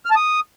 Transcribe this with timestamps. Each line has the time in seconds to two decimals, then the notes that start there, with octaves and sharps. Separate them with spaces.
0.05 F6
0.11 A5
0.16 D#6